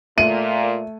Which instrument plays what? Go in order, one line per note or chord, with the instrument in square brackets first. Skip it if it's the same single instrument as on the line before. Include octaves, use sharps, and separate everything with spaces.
[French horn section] A#2 [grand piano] A3 [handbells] E5 [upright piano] D#7